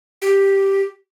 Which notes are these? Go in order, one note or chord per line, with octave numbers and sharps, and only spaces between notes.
G4